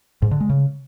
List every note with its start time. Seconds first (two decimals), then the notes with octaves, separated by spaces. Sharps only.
0.22 G#2
0.31 D3
0.40 G#3
0.49 C#3